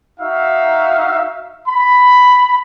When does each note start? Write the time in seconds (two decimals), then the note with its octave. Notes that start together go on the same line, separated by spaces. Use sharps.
0.20 D#4 F#4 E5 F5
1.68 B5